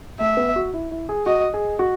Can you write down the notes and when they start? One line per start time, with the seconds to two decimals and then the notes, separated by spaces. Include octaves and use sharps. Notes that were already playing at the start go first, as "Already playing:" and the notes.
0.20 A3 E5
0.37 B3
0.56 F#4
0.73 E4
0.91 E4
1.09 G#4
1.26 F#4 D#5
1.54 G#4
1.79 F#4